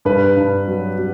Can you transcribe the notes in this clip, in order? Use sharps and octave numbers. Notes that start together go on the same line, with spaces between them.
G2 B4
G2
F#3
F#3